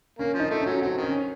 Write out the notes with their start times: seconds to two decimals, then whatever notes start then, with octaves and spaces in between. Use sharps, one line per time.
0.19 A#3 C#4
0.34 F3
0.40 D#4
0.51 A3
0.62 F#3 C#4
0.81 F#3 C4
0.98 D#3 C#4